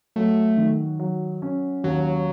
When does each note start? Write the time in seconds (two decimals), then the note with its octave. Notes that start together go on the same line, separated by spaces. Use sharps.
0.16 F#3 A3
0.57 D#3
0.99 F#3
1.42 C#4
1.84 D#2 F#3